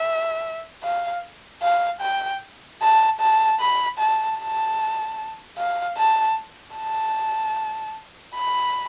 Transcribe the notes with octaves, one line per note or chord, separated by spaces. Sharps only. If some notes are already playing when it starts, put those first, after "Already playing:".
Already playing: E5
F5
F5
G5
A5
A5
B5
A5
A5
F5
A5
A5
B5